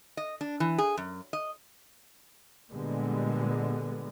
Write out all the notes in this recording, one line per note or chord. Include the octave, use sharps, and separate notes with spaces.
D#5
D4
E3
G#4
F#2
D#5
A#2 D3 G3 G#3 B3